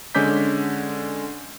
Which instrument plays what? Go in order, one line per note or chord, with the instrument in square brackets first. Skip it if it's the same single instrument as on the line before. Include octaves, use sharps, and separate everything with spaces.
[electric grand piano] D3 G#3 C#4 D6 G6 B6